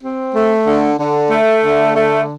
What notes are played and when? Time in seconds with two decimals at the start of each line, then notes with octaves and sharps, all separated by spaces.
0.02 C4
0.35 A3
0.67 D3
0.99 D3
1.31 A3
1.64 D3
1.95 A3